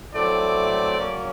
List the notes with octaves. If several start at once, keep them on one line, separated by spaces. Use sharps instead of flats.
A2 F#3 A3 C4 D5
C#3 F#3 A#3 C#4